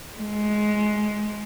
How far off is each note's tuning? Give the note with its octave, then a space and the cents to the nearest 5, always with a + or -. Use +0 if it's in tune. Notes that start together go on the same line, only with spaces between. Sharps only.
G#3 +15